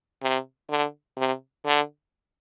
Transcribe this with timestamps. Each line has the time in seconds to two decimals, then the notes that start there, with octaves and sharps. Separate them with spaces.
0.23 C3
0.70 D3
1.17 C3
1.66 D3